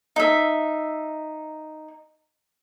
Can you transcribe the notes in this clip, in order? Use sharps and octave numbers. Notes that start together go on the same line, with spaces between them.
D#4 E5